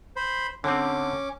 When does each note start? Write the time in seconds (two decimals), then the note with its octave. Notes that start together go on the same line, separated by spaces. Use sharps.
0.16 C5 B5
0.64 D3 C4 C#4 D6